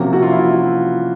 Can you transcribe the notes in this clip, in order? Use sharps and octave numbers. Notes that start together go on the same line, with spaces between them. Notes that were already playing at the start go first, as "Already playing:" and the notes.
Already playing: C3 F3 A#3 C#4 F#4
F#4
F4
E4